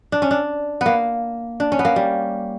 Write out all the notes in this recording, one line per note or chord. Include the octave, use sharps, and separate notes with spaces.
D4
C#4
D4
A#3 B3
D4
C#4
B3
A#3
G3